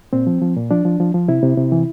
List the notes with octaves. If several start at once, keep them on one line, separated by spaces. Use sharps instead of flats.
A#2 C4
F3
F3
A#2
F3 D4
F3
F3
F3
C3 E4
C3
C3
E3